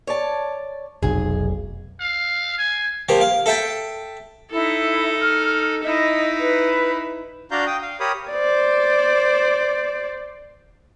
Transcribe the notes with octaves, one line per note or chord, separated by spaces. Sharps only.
C#5 D5 A5
F1 B1 G#4
F5
G#5
F3 A#3 G4
F5
A4 E5 G5 A5
D#4 E4 A4
F6
D#4 E4 D#5
B4
D4 F#4 D5 F5 A#5 G6
G5 D#6
F5
G4 A#4 C#5 B5 D#6
C5 D5